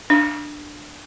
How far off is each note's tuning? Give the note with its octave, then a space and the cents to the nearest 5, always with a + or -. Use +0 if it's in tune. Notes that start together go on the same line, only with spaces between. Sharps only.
D4 +10